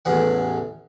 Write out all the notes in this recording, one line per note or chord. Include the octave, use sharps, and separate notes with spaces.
A1 E2 F#5